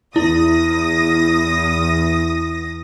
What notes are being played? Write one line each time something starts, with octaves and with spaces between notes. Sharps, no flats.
E2 E4 D#6 A#6